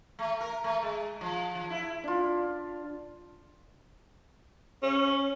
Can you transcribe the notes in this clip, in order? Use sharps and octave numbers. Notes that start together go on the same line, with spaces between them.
A3
A#4
A3
G#3
F3
F3
E4
D4 F4
C#4